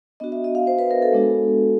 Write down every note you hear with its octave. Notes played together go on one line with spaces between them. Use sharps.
B3 D4 F#4 D#5
E5
D#5
F5
C5
B4
A#4
A4
G#3 B3 D4 F#4